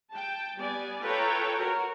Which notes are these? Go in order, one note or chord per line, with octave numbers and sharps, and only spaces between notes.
G5 A5
G3 B3 D5 G#5
F4 A4 B4 C#5 G5 A#5
F#4 A#4 C#5